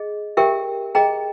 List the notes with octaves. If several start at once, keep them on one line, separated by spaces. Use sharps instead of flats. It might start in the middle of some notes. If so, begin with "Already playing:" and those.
Already playing: G#4 D#5
G4 A#4 E5 G5
G#4 D#5 G5 A#5